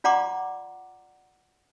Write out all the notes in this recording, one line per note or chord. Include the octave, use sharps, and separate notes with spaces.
F4 D5 F#5 A#5 C6 D6